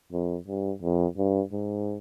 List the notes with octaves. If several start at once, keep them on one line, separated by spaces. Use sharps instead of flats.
F2
G2
F2
G2
G#2